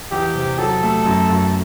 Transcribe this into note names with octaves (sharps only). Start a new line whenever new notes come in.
E2 G4
C3
F#3 A4
A3
F#2
F#2